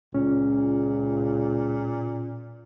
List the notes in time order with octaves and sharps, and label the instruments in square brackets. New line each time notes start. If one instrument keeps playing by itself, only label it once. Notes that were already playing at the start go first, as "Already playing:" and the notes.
[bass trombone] C#2 [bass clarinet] A#2 [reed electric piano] C#4